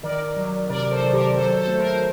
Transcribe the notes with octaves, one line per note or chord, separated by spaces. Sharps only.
D#3 A#4 D5
F#3
C3 A#4 D5
A4 C5
D#3
G4 A#4
F#3 A4 C5
A4 C5
A3
A#4
C5